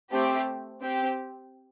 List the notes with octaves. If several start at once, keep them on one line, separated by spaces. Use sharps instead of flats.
A3 C4 G4
C4 G4